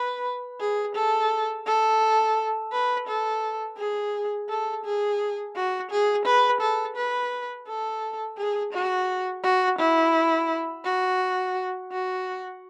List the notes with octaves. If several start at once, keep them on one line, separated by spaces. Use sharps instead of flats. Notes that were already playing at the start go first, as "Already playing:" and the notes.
Already playing: B4
G#4
A4
A4
B4
A4
G#4
A4
G#4
F#4
G#4
B4
A4
B4
A4
G#4
F#4
F#4
E4
F#4
F#4